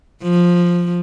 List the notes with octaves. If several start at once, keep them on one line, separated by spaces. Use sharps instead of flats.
F3